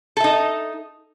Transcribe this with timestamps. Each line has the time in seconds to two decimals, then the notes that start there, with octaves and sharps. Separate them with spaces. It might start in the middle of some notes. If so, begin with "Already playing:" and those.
0.17 A4
0.20 E5
0.24 D#4